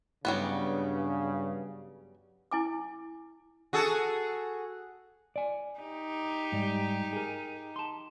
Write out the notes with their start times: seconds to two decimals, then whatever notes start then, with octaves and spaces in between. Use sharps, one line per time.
0.25 G2 C#3 F#3 G3 B3
2.51 E4 G#5 D6
3.73 F#4 G#4 A4
5.36 D5 G#5
5.79 D#4 G4
6.52 G#2 G3
7.13 G#4 A#4
7.76 A5 C6